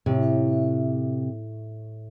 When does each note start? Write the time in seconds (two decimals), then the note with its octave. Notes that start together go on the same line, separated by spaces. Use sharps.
0.06 A2 C3